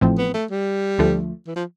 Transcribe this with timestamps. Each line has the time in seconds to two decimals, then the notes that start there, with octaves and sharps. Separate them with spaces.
0.01 A1 A2 F3 C4
0.18 B3
0.34 A3
0.50 G3
0.98 D2 D3 F3 A3
1.47 E3
1.56 F3